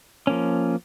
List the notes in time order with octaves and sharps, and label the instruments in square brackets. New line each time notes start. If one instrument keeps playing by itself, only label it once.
[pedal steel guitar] F3 A#3 C#4